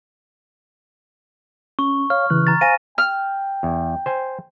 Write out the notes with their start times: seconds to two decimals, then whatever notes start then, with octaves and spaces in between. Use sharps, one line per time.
1.79 C#4 C#6
2.10 C#5 F5 F6
2.30 C#3 E3 F#6
2.47 A#5 A6
2.61 C5 F5 G#5 A#6 D#7
2.98 G5 F6
3.63 E2
4.06 C5 G#5